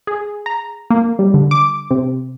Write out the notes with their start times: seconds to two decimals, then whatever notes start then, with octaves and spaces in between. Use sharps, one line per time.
0.07 G#4
0.46 A#5
0.90 A#3
1.19 G3
1.34 D3
1.51 D6
1.91 C3